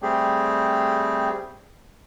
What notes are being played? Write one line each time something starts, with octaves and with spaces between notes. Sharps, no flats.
G3 A3 C4 G4 G#4